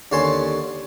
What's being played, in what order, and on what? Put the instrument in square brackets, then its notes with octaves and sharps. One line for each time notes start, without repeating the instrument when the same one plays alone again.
[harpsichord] D#2 D3 C#4 G#5 A5 C6